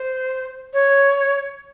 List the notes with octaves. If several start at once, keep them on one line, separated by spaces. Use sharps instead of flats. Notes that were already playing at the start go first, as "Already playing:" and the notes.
Already playing: C5
C#5